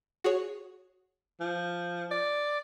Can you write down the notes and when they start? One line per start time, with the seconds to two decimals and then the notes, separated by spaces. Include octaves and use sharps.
0.24 F#4 G#4 C#5
1.40 F3
2.11 D5